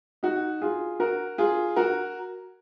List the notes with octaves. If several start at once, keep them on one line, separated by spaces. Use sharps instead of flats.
D#4 F#4
F4 G#4
F#4 A#4
F4 G#4
F#4 A#4